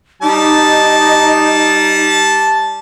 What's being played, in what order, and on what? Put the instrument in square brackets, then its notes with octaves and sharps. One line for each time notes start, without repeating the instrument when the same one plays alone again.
[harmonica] G3 A5 [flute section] D#4